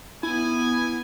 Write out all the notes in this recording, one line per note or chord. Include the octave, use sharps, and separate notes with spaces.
B3 E4 G#5